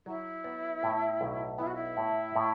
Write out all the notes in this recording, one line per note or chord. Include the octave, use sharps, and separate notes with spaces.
F#3 E4
B3
A2
B1
B3 E4
F#4
E4
A2
A2